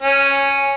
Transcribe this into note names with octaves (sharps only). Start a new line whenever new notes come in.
C#4